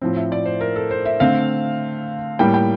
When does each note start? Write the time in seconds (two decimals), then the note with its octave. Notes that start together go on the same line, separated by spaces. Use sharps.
0.01 A2 F3 C4
0.16 E5
0.32 D5
0.46 C5
0.61 A#4
0.76 A4
0.91 C5
1.05 E5
1.20 D3 A3 C4 F5
2.39 A2 G3 A#3 G5
2.54 G5